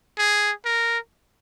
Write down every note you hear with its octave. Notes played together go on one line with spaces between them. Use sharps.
G#4
A#4